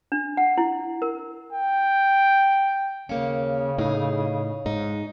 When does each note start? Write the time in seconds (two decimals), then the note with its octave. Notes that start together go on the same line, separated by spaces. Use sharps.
0.12 D4
0.37 F#5
0.58 E4
1.02 A#4
1.53 G5
3.09 D#2 C#3 A#3 C#4 C#5 F5
3.78 A2 D#4 G#4
4.66 G#2 D#4